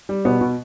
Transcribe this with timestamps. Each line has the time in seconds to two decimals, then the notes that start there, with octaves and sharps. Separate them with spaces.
0.09 G3
0.25 B2 B3
0.41 B2